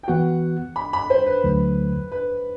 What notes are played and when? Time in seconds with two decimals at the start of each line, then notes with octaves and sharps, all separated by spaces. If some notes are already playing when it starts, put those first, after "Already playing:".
0.03 G5
0.08 E3 B3 F#4 F#5
0.76 B5
0.93 B5
1.10 C5
1.26 B4
1.44 D2 D3 F#3 A3
2.12 B4